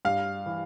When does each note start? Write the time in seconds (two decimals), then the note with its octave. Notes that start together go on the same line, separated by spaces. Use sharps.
0.05 G2 F5
0.46 E3